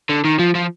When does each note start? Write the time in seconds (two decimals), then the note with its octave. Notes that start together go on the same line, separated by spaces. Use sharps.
0.09 D3
0.25 D#3
0.39 F3
0.55 F3